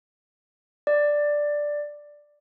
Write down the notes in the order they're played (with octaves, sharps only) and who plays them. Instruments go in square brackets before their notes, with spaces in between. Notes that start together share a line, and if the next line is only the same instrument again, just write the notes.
[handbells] D5